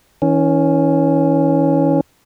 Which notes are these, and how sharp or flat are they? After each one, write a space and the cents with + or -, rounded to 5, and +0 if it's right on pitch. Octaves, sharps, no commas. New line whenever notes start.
E3 -45 C#4 +0